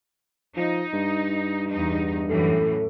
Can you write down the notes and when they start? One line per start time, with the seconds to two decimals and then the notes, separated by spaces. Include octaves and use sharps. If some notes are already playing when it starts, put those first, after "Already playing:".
0.56 F3 D#4
0.93 G2
1.69 E2 D#4
2.28 F#2 A2 E3 A4